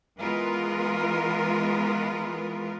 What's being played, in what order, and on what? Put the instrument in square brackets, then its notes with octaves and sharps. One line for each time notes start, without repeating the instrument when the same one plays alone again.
[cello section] E3 G#3 B3 F4 A#4 B4